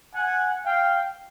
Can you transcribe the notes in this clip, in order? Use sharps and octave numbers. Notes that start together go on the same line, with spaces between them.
F#5 G#5
F5 G5